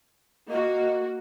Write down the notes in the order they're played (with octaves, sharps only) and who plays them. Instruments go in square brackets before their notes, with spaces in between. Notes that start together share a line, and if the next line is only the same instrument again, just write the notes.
[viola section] A#3 F#4 [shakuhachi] D#5